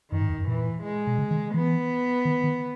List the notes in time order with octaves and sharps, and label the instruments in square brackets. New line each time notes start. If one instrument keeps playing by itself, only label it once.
[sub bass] F#2 [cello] D#3
[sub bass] G#2
E2
F#2
[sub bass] A#2 [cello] E3
[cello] G#3
[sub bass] B2
C#3
D#3
[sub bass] E3 [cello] B3
[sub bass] D#3
D#3